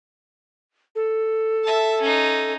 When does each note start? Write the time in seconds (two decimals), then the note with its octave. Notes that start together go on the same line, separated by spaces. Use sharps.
0.95 A4
1.64 E5 A5
2.02 C#4 D#4